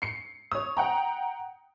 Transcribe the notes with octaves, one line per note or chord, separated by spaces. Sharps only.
C7 C#7
C#5 D#6
F#5 G5 A#5